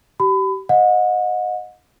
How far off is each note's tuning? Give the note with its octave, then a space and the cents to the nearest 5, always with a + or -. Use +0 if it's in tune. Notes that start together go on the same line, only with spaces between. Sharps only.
G4 -35 B5 +30
D#5 +0 F#5 -35